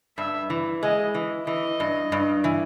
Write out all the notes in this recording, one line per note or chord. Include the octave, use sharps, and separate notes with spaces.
G2 E5
E3
G#3 D#5
E3
E3 D#5
G2
G2
E3